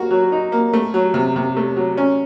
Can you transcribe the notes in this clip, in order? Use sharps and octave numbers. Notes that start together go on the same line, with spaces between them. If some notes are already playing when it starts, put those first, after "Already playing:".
Already playing: A#3 F#4
F#3
D#4
A#3
A3
F#3
C3
C3
A3
F#3
C#4